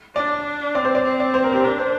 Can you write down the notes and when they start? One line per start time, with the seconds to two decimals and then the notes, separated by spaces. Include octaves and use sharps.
0.16 D4 D5
0.75 C4 D5
0.85 C5
0.95 D5
1.05 C4
1.20 D5
1.34 C5
1.44 A#4
1.54 G4
1.64 D4 A#4
1.79 C5